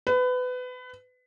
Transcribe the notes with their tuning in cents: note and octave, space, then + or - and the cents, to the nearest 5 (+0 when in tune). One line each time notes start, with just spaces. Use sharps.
B4 +25